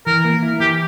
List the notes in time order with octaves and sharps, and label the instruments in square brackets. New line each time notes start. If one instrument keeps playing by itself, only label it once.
[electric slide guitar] E3 [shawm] A#4
[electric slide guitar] A#3
E4
[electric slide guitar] E3 [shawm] G4